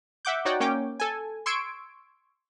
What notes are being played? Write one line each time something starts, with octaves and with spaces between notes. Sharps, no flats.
E5 F#5 D6 G6
D#4 F#4 C#5 D5 F#5 G5
A#3 C#4 C#5 G5 D6
A4 G#5
C6 C#6 E6 G#6 D7